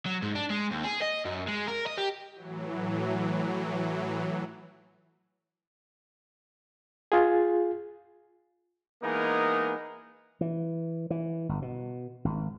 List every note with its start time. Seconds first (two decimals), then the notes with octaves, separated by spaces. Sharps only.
0.06 F#3
0.22 G#2
0.35 D4
0.50 G#3
0.71 D#2
0.84 G#4
1.02 D#5
1.25 F#2
1.47 G#3
1.67 A#4
1.86 D#5
1.97 G4
2.33 A2 E3 F#3
7.12 F4 G#4
9.02 E3 G#3 A#3 B3 D#4 A#4
10.41 E3
11.10 E3
11.49 G1
11.62 B2
12.25 G#1